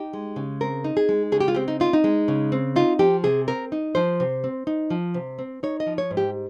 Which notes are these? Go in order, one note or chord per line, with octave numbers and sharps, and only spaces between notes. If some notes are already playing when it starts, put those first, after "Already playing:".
Already playing: D#4 G4
G#3
C#3
C4 A#4
D#4
G#4
G#3
C#3 G#4
G4
F4
C4 G4
D#4
D#4 F4
D#4
G#3
C#3
C4
D#4 F4
F3 G4
C3 G#4
C4 A#4
D#4
F3 C5
C3
C4
D#4
F3
C3
C4
D#4 C#5
D#5
F3
C#5
G#2
G4